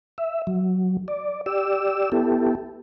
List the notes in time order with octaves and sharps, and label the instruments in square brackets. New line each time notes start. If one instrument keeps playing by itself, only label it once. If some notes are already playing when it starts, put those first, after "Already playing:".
[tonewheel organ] E5
F#3
D5
G4 D5 E6
B3 E4 G4 A4